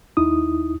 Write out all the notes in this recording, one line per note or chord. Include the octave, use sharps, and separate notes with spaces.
D#2 D#4 E4 D#6